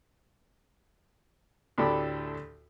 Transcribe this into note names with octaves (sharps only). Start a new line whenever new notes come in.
D2 A2 D4 G4 A4 B5